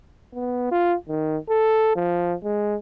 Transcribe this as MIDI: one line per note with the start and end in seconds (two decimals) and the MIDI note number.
0.34 0.70 59
0.71 0.95 65
1.08 1.37 51
1.49 1.92 69
1.96 2.34 53
2.44 2.76 56